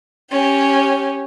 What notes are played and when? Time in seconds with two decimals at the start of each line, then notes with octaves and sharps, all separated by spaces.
0.31 C#4 G4